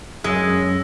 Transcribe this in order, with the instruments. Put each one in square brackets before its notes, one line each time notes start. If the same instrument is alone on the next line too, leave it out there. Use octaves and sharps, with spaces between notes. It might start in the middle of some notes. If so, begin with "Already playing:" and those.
[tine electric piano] F#2 [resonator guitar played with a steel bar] G#3 [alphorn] C#4 [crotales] E6 A#6